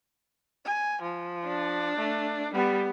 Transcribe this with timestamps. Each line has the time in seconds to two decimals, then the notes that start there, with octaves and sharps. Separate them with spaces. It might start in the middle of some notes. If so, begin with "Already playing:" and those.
0.65 G#5
1.02 F3
1.47 D4
1.97 A3
2.54 G3 B3